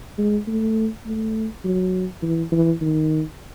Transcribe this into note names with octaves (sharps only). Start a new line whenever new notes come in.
G#3
A3
A3
F#3
E3
E3
D#3